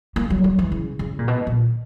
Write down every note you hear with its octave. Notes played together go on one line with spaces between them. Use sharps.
A#3
F#3
F#3
E3
C#3
C#3
A#2
B2
A#2